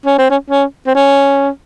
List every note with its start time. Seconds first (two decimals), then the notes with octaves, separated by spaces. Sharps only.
0.06 C#4
0.19 C4
0.30 C#4
0.50 C#4
0.87 C4
0.95 C#4